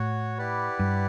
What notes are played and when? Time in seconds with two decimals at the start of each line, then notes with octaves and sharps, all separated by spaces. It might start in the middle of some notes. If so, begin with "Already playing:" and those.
Already playing: A2 F#4 C#5 F#5
0.38 E4 G4 B4 D5 F#5
0.79 G2